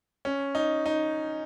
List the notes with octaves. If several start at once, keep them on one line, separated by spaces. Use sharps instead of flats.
C#4
D#4
D#4